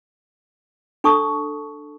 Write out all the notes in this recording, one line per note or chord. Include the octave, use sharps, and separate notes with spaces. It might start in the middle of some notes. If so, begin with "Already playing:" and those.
D4 A4 A5 C#6 D#6